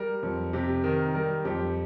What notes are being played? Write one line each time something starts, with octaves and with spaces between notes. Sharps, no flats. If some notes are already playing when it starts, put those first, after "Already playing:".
Already playing: G3 A#4
F2
C3 G4
D#3 A#4
G3 A#4
F2 G4